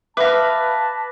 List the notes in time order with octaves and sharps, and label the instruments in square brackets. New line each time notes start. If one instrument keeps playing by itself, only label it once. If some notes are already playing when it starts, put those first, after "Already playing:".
[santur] B4 [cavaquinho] E5 F5 [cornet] A5 [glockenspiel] D6 A#6